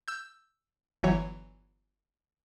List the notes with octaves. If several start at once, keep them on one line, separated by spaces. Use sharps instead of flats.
E6 G6
G1 E3 F#3 C#5